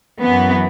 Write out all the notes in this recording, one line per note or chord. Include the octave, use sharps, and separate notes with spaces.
F#2 E3 B3